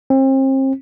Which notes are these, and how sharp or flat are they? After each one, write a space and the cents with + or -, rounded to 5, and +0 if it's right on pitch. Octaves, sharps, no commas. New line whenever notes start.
C4 +35